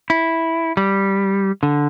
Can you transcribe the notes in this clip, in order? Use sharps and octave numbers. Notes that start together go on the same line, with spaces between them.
E4
G3
D3